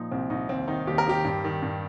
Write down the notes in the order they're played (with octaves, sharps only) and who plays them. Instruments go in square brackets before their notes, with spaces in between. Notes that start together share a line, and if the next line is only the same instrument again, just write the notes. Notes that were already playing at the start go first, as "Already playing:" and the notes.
Already playing: [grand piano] A#2 F3 D#4
C2 C4
C2 D#4
D#2 C4
D#3 D#4
D#2 G4
A#4
D#3 G4
G2
D#3
G2